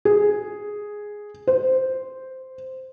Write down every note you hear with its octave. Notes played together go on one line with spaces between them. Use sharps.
G#4
C5